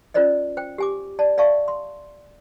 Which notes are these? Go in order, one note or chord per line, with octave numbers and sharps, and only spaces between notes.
C#4 F4 A#4 C5 D5 D#5
C5 G5
G4 G#5 D6
D5 A5
D5 E5 F5 A5 C#6
C6